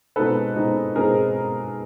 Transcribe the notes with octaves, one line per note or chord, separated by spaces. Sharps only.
B2 G#3 C4 D#4 A4 B4
B2 G#3 C4 D#4
B2 G#3 C4 D#4 G#4 A#4